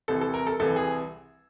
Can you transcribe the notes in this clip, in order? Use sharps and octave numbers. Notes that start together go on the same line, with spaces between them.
C2 C3 E3 A4
A4
A#4
A4
C2 C3 E3 A4
G#4